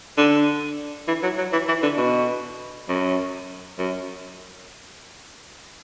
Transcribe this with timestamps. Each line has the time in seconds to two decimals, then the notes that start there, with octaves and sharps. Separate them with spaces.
0.17 D3
1.08 E3
1.23 F#3
1.38 F#3
1.52 E3
1.68 E3
1.83 D3
1.97 B2
2.89 F#2
3.78 F#2